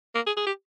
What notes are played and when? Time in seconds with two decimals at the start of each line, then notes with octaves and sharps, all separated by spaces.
0.15 A#3
0.26 G#4
0.37 G#4
0.46 G4